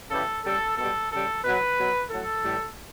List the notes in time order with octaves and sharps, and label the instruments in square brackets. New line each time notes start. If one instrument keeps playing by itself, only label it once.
[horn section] C#3 E3 G3 A4
C#3 G3 A4
B2 G3 A4
C#3 G3 A4
B2 F#3 B4
B2 F#3
A2 F#3 A4
A2 E3 G3